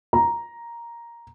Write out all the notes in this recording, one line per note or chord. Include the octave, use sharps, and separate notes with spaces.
A#5